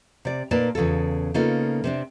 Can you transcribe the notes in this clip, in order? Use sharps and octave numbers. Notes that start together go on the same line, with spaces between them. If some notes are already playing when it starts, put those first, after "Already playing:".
C3 D5
A#2 A#3 D#4 B4 D5 A5
E2 C#3 F4 A4
C#3 A#3 B3 D#4 F4 A4
C3 C4 D4